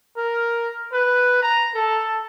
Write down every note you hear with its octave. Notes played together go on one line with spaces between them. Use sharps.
A#4
B4
A#5
A4